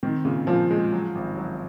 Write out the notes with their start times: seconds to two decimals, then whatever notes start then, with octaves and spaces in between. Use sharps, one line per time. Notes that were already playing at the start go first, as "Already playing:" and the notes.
0.03 D#3 C4
0.25 A#2 C#3
0.47 A#2 F3
0.71 G#3
0.93 F#3
1.15 G#1
1.38 F#3